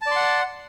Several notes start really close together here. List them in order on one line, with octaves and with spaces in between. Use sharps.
A5 D5 C6 F#5